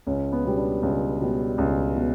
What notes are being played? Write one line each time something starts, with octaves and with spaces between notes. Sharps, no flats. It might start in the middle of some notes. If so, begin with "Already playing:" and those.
C#2 C#4
B3
B2 G3
D4
C#2
B2 G3
C#2
B2